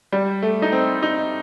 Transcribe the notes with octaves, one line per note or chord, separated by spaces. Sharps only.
G3
A3
D#4
C4
D#4